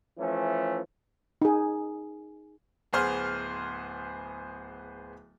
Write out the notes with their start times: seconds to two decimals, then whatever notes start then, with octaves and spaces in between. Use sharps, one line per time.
0.18 E3 F3 A3 C#4
1.42 D#4 G#4
2.93 D1 B3 G#4 C5 C6 F6